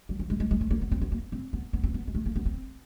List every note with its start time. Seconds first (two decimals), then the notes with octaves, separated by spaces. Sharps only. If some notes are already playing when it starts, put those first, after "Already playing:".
0.09 F#3
0.19 F3
0.30 G#3
0.40 G#3
0.51 G#3
0.61 A3
0.71 A#3
0.81 B3
0.92 C4
1.01 B3
1.12 A#3
1.32 C4
1.53 B3
1.73 B3
1.84 C4
1.94 B3
2.07 G#3
2.15 A3
2.26 A#3
2.36 B3
2.46 C4